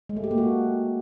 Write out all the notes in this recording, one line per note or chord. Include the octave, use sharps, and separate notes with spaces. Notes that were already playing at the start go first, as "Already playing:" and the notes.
G#3
A3
G4
A#3
F#4